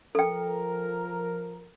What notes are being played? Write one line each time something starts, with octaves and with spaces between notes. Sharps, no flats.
F3 A4 A#4 G5